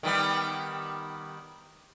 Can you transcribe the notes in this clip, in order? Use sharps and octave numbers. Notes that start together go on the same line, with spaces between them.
D#3 G3 B3